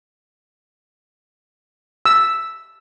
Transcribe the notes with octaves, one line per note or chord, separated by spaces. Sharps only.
E6